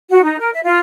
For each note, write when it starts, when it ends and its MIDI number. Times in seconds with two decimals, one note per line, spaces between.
0.11 0.20 66
0.23 0.38 63
0.38 0.50 70
0.52 0.60 76
0.65 0.79 65